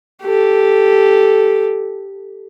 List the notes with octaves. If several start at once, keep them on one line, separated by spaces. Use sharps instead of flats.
G4 A4